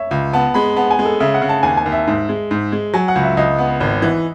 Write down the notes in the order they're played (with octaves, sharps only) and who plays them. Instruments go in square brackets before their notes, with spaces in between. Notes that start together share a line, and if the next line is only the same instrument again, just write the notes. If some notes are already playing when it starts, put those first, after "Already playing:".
Already playing: [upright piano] C#5 E5
[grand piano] C#2
[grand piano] B3 [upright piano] A5
[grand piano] G#3 [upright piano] B5
[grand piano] B3 [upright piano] A5
[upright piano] G#5
[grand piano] G#3
[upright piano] A4
[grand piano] C#3 [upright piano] E5
[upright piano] F#5
[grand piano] C#3
[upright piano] A5
[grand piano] D#2 [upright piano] G#5
[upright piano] G#5
[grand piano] D#2
[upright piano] E5
[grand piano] G#2
G#3
G#2
G#3
[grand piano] F#3 [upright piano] G#5
[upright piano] F#5
[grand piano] C#2
[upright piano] E5
[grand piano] C#2 [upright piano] D#5
[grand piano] B3
G#1
E3